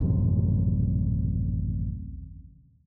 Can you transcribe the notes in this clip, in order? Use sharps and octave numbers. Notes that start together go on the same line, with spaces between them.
D#1 A1 F#2 C3